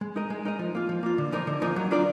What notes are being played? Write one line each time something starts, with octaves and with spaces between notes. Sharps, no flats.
G#3
D#4 A#4 D#5
G#3
D#4 A#4 D#5
F3
A#3 F4
F3
A#3 F4
D3
F3 A#3 D#4 A#4
D3
F3 A#3 D#4 A#4
F#3
D4 F4 A#4 D5